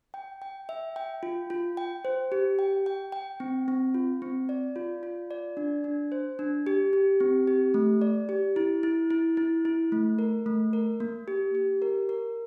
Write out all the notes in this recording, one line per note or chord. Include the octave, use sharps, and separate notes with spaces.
G5
G5
E5
G5
F4
F4
G5
C5
G4
G5
G5
G5
C4
C4
F4
C4
D5
F4
F4
D5
D4
D4
C5
D4
G4
G4
C4
G4
A3
D5
G4
E4
E4
E4
E4
E4
A3
A#4
A3
A#4
A#3
G4
G4
A#4
A#4